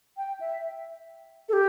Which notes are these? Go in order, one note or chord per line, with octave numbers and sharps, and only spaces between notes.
G5
E5
A4
G4